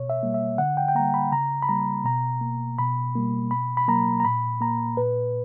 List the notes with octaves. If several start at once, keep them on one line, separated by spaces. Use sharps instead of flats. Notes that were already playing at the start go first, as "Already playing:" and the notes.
Already playing: B2 C#5
E5
G3 A#3
E5
D3 F#5
G5
G5
G3 A#3 A#5
B5
C#3 A#5
B5
G3 A#3 A#5
B2 A#5
A#3
B2 B5
G3 A#3
B2 B5
B5
F#3 A#3 A#5
A#5
A#2 B5
A#3 A#5
A#2 B4